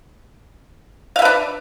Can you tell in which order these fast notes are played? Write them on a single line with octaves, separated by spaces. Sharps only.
F5 E5 B4 D4